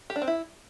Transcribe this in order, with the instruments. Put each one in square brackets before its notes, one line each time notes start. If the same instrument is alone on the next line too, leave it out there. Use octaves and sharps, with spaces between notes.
[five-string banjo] G4
D4
C4
E4